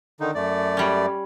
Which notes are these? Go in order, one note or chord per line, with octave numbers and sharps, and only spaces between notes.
D3 D#3 D#4
F#2 A3 D5
G3 C#4